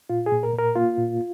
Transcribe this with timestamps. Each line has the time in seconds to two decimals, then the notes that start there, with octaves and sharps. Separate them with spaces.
0.10 A#2 F4
0.26 G#4
0.32 A#2
0.43 A#4
0.54 A#2 A#4
0.76 A#3 F4
0.98 A#2